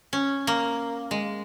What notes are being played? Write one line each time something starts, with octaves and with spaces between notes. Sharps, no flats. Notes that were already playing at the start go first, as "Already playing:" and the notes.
C#4
A#3
G#3